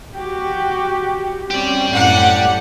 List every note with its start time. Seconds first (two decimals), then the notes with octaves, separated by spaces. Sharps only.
0.16 F#4 G4
1.51 C4 C#4 G4 D5
1.94 F#2 A2 F#5